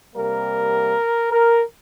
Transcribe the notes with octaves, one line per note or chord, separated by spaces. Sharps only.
C3 G3 A#3 A#4
A#4